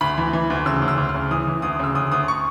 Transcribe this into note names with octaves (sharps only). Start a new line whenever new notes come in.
D2 B5
E3
E3
D2
C#3 E6
D2
E6
D2
F6
C#3
E3 D#6
E3
D2 D#6
C#3 E6
D2 D#6
D2 D#6
C#6